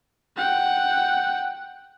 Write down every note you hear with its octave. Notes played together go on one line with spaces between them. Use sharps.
F#5 G5